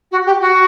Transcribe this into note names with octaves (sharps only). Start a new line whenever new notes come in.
F#4
G4
F#4